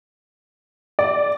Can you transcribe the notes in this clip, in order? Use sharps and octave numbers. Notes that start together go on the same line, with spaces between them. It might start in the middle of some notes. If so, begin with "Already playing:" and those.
D5